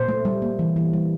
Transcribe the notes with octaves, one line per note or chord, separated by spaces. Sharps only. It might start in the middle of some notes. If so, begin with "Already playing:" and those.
Already playing: A#2 C5
A3
G3
A#3
E3
E3
G3